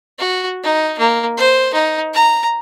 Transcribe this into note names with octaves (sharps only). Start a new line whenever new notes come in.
F#4
D#4
A#3
C5
D#4
A#5